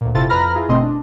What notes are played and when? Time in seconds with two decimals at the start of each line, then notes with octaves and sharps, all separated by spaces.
0.01 D2 A#2
0.14 G1 C3 E4 F4 A4 A6
0.29 F2 B4 A#5 B5 F6 A#6
0.55 E4 F4 G#4
0.68 G1 B2 A3 C4 D#5 C6
0.82 D4